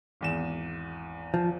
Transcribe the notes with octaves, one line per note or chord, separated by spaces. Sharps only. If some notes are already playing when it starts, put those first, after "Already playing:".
G#1 E2 E7
F3